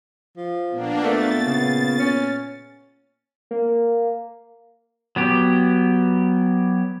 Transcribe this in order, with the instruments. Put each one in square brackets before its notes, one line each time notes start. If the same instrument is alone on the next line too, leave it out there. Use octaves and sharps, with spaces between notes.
[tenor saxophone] F3
[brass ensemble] A#2 B3 [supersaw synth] A#3 D4
[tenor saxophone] A3 [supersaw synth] A6
[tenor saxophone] C#3
C#4
[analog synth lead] A#3
[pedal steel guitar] F#3 B3 G4